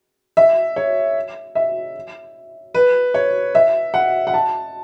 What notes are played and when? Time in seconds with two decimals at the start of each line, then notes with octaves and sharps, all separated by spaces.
0.37 E5
0.76 C#5
1.55 E5
2.75 B4
3.14 C#5
3.55 E5
3.94 F#5
4.27 F#5
4.34 A5